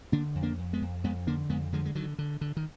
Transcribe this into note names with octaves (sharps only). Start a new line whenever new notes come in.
D3 A#3 D4
F2
A#3 D4
F2
G#3 B3
F2
F2 G#3 B3
D3 A#3 D4
F2 G#3 B3
D3 F3 G#3
G#3
D3 D#3 F#3
D3
D3
D#3